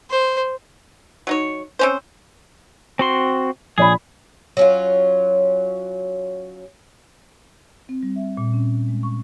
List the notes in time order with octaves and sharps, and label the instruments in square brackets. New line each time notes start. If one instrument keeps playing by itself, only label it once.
[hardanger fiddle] C5
[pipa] F#3 D#4 C#5
C4 C#4 C5
[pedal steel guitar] C4 F#4 C6
[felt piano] A#1 D5 B5 [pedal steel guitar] G#4
[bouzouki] F#3 C#4 F4
[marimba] C4
G3
E5
A#2
C#4
G#3
C#6